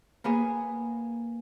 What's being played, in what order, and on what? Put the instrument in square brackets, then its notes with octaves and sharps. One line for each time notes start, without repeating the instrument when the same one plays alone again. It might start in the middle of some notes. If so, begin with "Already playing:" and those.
[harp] A#3 B3 G#4